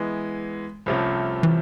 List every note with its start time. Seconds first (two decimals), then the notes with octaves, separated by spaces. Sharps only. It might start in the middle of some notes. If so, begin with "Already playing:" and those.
Already playing: E3 G#3 B3
0.86 C2 C3 F3 A3 C#4
1.43 E3